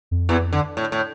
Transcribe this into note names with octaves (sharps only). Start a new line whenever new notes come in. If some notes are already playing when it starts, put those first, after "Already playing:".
F2
E2 E3
D3
A2
A2